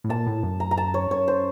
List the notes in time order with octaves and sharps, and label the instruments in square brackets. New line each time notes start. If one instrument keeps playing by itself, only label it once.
[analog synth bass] A2
[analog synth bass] A#2 [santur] A5
[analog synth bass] A2
F#2
[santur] A#5
A#5
A5
C#5
[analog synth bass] F#2 [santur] C#5
[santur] C5